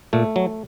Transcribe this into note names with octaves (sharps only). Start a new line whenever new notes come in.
A#2 A3
F#3